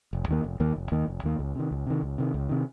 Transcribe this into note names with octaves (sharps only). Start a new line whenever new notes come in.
F1
D#2 D#3 A#3
F1
D#2 D#3 A#3
F1
D#2 D#3 A#3
F1
D#2 D#3 A#3
C#2
C3 D#3
C#2
C3 D#3
C#2
C3 D#3
C#2
C3 D#3